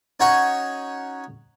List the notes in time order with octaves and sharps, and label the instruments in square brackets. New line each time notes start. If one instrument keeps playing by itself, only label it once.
[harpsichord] C#4 D#4 F#4 C#5 F#5 C#6